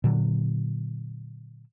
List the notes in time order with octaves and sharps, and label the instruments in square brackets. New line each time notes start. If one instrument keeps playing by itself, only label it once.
[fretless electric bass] A#2 D3 F#3